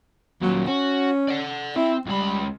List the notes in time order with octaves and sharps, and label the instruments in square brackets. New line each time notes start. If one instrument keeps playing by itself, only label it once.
[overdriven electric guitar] D#2 A#2 [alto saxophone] F#3
[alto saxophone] C#4 [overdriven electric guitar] F#4
[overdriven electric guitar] D5 F#5
[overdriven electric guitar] C4 [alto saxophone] E4
[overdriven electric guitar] C#2 B5 [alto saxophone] G3